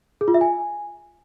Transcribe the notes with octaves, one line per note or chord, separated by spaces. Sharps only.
G#4
F4
E5
G#5